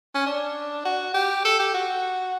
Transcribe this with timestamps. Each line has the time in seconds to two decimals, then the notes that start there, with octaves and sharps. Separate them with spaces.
0.15 C#4
0.26 D4
0.85 F#4
1.14 G4
1.45 A4
1.59 G4
1.74 F#4